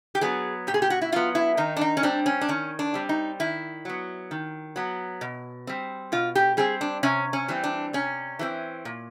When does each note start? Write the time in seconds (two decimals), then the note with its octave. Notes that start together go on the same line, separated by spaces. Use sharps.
0.15 G4
0.21 F#3 B3 G#4
0.67 A#2 G4
0.74 G#4
0.82 G4
0.90 F#4
1.02 E4
1.12 F#3 B3 F4
1.35 E4
1.57 D#3 D#4
1.77 D4
1.81 D#4
1.97 C#4
2.03 G3 C4 D4
2.26 C#4
2.41 D4
2.49 D#3 C#4
2.79 D4
2.94 G3 C4
3.09 D#4
3.40 D#3 E4
3.85 F#3 B3
4.31 D#3
4.76 F#3 B3
5.21 B2
5.67 G3 C4
6.12 B2 F4
6.35 G4
6.57 G3 C4 G#4
6.81 D4
7.03 C3 C#4
7.33 C#4
7.48 E3 G3 C4
7.64 D4
7.93 C3 C#4
8.39 E3 G3 C4
8.85 A#2